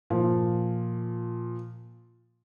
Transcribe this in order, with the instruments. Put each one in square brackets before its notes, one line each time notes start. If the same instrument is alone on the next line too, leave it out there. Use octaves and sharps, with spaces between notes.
[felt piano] A#2 [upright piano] F3